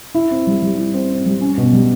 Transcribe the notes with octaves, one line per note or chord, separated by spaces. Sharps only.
E4
C4
G3
G3
E4
C4
C4
G3
C#4
B2
G3